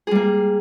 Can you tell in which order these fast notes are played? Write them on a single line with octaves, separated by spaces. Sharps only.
G#4 G3 A#3